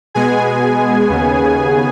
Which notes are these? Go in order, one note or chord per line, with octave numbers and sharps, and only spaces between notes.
B2 G#3 B3 G#4 G#5
D#2 C#3 B3